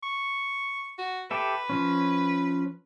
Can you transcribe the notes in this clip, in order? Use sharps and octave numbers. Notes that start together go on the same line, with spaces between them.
C#6
F#4
G4 A4 B4 E5
F3 C#4